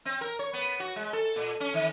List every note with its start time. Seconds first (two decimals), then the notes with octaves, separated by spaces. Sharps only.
0.05 C4
0.21 A#4
0.39 C#5
0.53 B3
0.80 F#4
0.96 G#3
1.13 A4
1.36 A#2
1.60 C#4
1.74 D#3